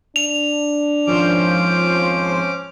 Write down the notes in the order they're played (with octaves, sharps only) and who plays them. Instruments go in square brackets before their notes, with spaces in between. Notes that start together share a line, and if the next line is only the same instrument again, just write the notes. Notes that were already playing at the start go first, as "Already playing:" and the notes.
[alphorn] D4 [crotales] F7
[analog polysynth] G#1 F3 C5 [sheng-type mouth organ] C#4 D6